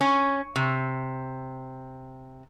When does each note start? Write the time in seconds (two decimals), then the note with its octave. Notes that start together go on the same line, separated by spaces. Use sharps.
0.01 C#4
0.56 C3